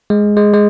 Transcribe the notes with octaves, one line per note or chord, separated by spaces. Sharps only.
G#3
G#3
G#3